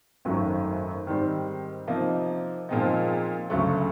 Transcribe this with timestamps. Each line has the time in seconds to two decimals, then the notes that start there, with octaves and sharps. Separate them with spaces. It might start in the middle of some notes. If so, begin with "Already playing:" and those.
0.25 G#1 F#2 D#3 F#3 A3
1.07 G#2 D#3 G3 C4
1.87 C3 F3 A#3 D#4
2.69 A#2 F3 G#3 C4 D#4
3.50 D2 C#3 F#3 A3